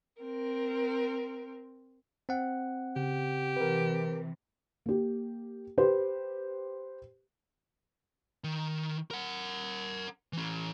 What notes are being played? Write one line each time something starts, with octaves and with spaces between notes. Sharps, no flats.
C4 A#4
C4 F#5
C#3 G4
C3 E3 A#4 B4
A#3 G4
G4 B4 C5
D#3
A#4 F#5
E3 C#4